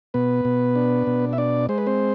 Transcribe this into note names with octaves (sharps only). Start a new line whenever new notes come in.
B2 B3 B4
B2
D4
B2
E5
D4 D5
G#3 C5
B4
C4 C5